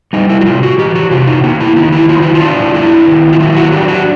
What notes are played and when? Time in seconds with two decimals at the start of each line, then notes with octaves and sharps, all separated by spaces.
0.13 G3 D#4
0.29 E4
0.41 F#4
0.46 C3 F4
0.63 F#4
0.78 E3 G4
0.95 F#4
1.11 C3 F4
1.27 D#4
1.44 A#3 D#4
1.60 E4
1.76 D#3 D#4
1.92 E4
2.09 F#3 F4
2.22 E4
2.35 F4
2.41 D4
2.75 A#3 E4
3.07 D#3
3.33 F4
3.39 F#3 E4
3.56 F#4
3.72 D4 G4
3.88 F#4